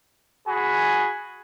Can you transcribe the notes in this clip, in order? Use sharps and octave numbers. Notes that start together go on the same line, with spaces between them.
F#4 G#4 G#5 B5